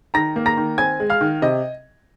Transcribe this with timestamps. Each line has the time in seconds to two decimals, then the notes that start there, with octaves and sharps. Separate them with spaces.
0.14 D#3 A#5 A#6
0.36 A#3
0.46 A#5 A#6
0.57 D#3
0.78 C4 G#5 G#6
1.00 G#3
1.10 F5 F6
1.21 D#3
1.42 C3 D#5